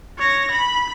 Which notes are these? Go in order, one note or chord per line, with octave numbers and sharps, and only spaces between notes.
C#5 A#6
B5